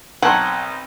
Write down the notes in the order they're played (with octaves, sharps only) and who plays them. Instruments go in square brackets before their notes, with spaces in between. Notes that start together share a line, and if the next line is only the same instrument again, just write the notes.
[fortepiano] B1 C6 [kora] C4 A#4 C#5 [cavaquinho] F#5 [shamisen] G5 A5